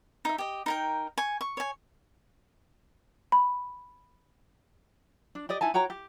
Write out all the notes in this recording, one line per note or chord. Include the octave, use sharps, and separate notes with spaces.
D#4 E5
G4 D#5
D#4 A#4 G5
G#5 C#6
C#6
C#5 G#5
B5
D4
G4 D5 D#5
D#4 E4 G#5 A5
F#4 C#5 G5 A#5
G4